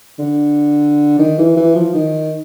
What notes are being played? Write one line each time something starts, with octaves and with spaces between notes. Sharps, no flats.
D3
D#3
E3
E3
F3
D#3